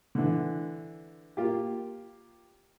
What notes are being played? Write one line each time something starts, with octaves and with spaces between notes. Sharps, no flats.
D3 E3
A#3 F4 G4